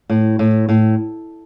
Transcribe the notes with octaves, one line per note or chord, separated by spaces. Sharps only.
A2
A2
A2